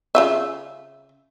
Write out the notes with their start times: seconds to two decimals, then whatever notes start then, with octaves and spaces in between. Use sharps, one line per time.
0.15 C#3 F4 E5